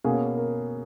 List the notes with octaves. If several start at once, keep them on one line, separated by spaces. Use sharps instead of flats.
B2 A#3 C#4 G#4
A#4